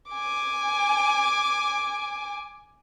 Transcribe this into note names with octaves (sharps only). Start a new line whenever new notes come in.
G#5 D6